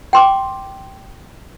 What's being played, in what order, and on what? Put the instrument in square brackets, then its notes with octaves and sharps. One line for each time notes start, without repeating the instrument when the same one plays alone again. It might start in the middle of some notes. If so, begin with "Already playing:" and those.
[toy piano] G5 C6 D6